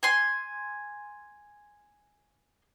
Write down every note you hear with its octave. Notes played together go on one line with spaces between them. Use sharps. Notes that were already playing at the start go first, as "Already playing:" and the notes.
G#5 C6